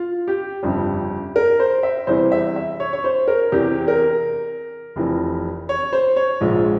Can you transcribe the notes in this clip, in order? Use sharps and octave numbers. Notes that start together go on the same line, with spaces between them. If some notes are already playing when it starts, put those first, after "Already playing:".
Already playing: F4
G4
G1 F2 C#3 G3
A#4
C5
E5
E2 C3 E3 G3 C5
E5
E5
C#5
C#5
C5
A#4
E2 C3 E3 G4
A#4
F1 F2 E3
C#5
C5
C#5
A#1 G#2 F3 G#3